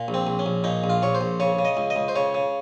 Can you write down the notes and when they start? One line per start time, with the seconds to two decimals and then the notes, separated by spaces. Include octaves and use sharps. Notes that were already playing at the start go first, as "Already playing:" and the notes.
Already playing: A#2
0.08 A#1
0.14 C4
0.27 A#1
0.39 C#4
0.46 A#1
0.64 A#2 D#4
0.84 A#1
0.90 F4
1.02 A#1 C#5
1.15 C5
1.21 A#1
1.40 C#3 C#5
1.59 C#3
1.65 D#5
1.77 C#2
1.90 D#5
1.96 C#2
2.08 C5
2.16 C#3 C#5
2.34 C#3